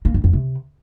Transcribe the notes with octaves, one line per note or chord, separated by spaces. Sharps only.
A#3
F#2
F2
C3